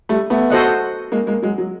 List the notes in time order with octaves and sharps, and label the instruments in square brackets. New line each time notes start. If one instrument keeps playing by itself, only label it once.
[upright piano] G3 A3
A3 B3
[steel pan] F#4 A4 C5 D#5 F#5
[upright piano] G#3 A#3
G#3 A#3
F#3 G#3
F#3